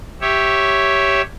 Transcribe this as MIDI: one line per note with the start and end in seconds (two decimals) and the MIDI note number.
0.21 1.21 67
0.21 1.21 73
0.21 1.21 76